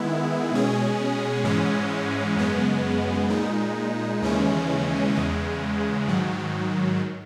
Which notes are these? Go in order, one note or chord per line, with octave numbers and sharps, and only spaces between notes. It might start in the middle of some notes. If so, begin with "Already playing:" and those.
Already playing: D#3 G#3 B3 E4
B2 G#3 C#4 G#4
G#2 E3 G#3 C#4
F#2 C#3 G#3 B3
A#2 G#3 D#4
D#2 C#3 E3 G#3 C#4
E2 C#3 G#3
G#2 D#3 F#3